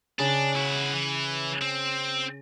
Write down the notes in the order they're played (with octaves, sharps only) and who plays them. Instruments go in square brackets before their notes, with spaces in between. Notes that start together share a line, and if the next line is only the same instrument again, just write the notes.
[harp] C#3 [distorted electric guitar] D4
[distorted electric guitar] E4 F#4
E3
C4